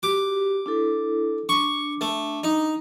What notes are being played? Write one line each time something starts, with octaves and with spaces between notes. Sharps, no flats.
F#4 G4 D6
D4 E4 A4
D4 C#6
A3
D#4